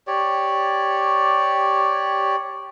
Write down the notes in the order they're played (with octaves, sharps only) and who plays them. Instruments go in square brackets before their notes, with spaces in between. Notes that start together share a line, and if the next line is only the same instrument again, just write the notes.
[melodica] G4 C#5 D5